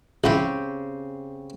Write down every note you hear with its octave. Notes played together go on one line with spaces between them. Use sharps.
C#2 C#3 C4 E4 G4